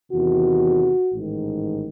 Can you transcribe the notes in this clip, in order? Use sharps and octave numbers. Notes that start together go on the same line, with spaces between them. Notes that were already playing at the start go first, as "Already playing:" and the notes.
E2 C3 D#3 F#4
A1 G#2 D#3